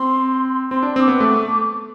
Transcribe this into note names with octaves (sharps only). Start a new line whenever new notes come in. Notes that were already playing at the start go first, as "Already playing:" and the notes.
Already playing: C4 C6
C4 C6
D4
C4 D6 E6
B3
A3